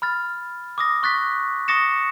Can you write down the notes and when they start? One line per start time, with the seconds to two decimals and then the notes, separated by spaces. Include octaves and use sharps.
0.02 B5 F6 A6
0.78 D6 D#6 A#6
1.03 C#6 F#6 A6 B6
1.68 C#6 D#6 A6 A#6 C#7 E7